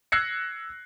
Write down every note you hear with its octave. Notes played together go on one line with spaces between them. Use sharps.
E6 F#6 G#6 A#6 C7 C#7